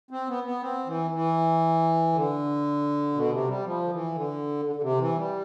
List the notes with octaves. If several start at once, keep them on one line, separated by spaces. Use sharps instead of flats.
C4
B3
B3
C4
E3
E3
D3
B2
C3
G3
F3
D3
E3
D3
D3
D3
C3
E3
G3